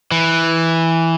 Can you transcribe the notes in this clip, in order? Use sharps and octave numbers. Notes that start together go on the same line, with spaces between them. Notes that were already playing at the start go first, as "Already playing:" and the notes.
E3